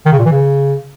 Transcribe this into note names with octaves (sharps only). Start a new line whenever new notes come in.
D#3
C#3
A#2
E3
C#3